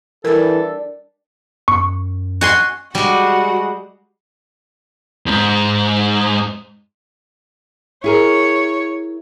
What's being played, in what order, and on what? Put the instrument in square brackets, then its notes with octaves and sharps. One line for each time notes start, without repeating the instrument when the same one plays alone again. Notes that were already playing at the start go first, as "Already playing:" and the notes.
[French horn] E3 [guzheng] G3 D4 [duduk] A4 [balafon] A#4
[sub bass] F#2 [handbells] C#6
[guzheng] F#4 G#5 C6
[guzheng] G3 G#3 [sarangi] F#4
[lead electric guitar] E2 G#2
[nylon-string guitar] E4 G#4 A#4 [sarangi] C#5